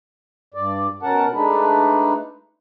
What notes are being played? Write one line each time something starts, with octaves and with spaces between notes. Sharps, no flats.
G2 D5
B2 C#4 A#4 F#5 A5
G#3 A3 D4 D#4 B4